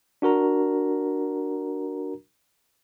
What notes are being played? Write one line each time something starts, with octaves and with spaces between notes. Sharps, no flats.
D4 F#4 A#4 A#5